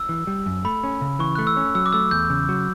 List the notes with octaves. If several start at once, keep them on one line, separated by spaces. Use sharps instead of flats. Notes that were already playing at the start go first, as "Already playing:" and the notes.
Already playing: E6
E3
G3
F#2
A3 B5
C#4
C#3
E3 C#6
A3 F#6
E6
C#4
F#3 E6
D6
A3 E6
E2 G6
C#3
F#3